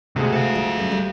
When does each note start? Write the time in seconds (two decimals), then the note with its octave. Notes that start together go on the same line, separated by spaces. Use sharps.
0.16 D2 C3 G#3
0.32 A4 F5
0.56 F3 D#4
0.79 F#2
0.92 G3